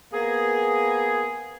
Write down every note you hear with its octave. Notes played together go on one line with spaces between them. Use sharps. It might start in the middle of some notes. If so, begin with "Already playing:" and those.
A#3 B3 G#4